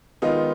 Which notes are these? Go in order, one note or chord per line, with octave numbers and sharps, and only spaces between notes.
D#3 G#3 B3 D#4 F4